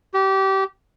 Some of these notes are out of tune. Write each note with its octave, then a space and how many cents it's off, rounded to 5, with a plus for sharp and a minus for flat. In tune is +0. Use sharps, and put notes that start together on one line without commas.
G4 -25